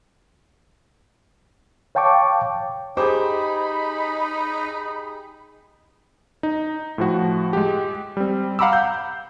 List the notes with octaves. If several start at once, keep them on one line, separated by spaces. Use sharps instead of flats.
C#5 F5 G5 A5 C#6 D6
D#4 G4 G#4 C5 B5 D6
D#4
A2 F3 F#4
G#3 G4
G3 C4
F5 F#5 A#5 B5 D6 E6
G6